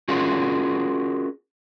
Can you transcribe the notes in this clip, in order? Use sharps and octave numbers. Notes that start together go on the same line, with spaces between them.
C#4 F4 F#4 G#4 A#4